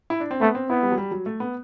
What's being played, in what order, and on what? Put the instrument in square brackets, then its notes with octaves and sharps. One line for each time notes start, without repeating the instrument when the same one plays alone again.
[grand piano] E4
D4
C4
[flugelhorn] A3 [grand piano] B3
[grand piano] C4
[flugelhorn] B3 [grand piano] E4
[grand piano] G3
F#3
G3
F#3
A3
B3